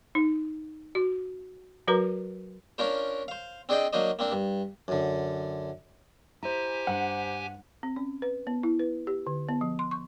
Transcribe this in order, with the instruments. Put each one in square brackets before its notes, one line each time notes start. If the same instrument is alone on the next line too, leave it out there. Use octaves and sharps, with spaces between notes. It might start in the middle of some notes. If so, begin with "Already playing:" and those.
[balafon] D#4
F#4
F#3 F#4 A#4 B4 A#5
[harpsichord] C#4 D4 F4 A#4 C5
C5 F5
C4 D4 G#4 D5 D#5 G5
F#3 A#3 D4 C5 D#5
A#3 C4 D4
G2
F#2 D3
[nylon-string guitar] E4 [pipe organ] G4 G#5 [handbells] C5 A#5
[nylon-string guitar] G2 [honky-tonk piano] F#5
[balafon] C4
C#4
B4
B3
E4
B4
G4
D3
B3
F3
C6
C#6